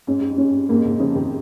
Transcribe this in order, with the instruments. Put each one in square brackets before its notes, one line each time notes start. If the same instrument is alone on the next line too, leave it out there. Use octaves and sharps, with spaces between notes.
[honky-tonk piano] G#2 [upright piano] C#4
[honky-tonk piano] G2
F2
[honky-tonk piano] G2 [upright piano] C#4
[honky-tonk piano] F2 G#2 [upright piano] A#3
[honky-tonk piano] G#2 C3
[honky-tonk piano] C#3 F3 [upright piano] C#4
[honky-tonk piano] C3 D#3